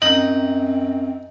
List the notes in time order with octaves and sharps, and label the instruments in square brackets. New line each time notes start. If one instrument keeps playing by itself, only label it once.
[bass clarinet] F#2 [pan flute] C4 [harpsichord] D#4 [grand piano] F#7